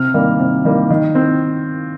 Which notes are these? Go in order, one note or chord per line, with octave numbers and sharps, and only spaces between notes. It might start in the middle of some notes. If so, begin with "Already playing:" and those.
Already playing: C3 F6
D#3 G3 A#3
C3
D#3 G3 A#3
D#3
C4